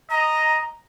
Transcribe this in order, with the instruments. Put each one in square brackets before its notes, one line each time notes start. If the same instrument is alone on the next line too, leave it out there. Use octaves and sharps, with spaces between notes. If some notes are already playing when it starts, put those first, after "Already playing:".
[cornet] D#5 [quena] A#5